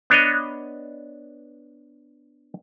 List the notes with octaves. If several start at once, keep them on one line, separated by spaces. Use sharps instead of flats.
B3 D4 C#5 D#5